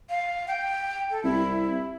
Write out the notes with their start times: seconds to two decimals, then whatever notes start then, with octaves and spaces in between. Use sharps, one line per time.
0.10 F5
0.48 G5
1.10 A4
1.24 C2 E4